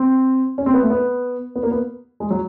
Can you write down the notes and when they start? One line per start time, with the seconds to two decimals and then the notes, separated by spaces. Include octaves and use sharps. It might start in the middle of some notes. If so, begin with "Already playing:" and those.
Already playing: C4
0.58 C#4
0.66 C4
0.74 B3
0.82 A3
0.90 B3
1.56 B3
1.63 A#3
1.71 B3
2.20 G#3
2.30 F#3